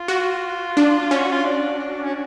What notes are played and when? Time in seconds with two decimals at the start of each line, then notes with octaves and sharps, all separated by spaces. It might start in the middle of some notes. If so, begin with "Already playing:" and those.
Already playing: F4
0.08 F#4
0.77 D4
1.11 C#4
1.19 F#4
1.32 F4
1.45 D4
1.79 D4
2.04 C#4